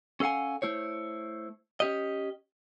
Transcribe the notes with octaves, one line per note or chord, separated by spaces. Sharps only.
C#4 A4 F5 F#5 G#5
A3 E4 C5 C#5
C#4 G4 D#5